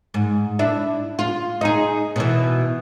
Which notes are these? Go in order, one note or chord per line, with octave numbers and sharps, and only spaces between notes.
G#2
D4 E4
F4
D#4 G#4
B2 E3